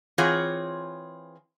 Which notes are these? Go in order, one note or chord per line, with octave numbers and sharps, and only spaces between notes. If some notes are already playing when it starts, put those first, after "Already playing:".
E3 C4 F4 G#4 C#5 F#5